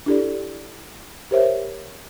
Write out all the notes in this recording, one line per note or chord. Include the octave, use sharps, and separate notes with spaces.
D4 E4 G4 A4 D5
G4 A#4 C5 C#5 E5